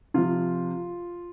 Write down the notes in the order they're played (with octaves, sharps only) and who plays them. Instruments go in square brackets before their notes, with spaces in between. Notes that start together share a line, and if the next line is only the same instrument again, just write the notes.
[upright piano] C3 F3 F4